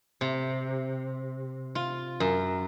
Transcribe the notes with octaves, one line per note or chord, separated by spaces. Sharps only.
C3
F4
F#2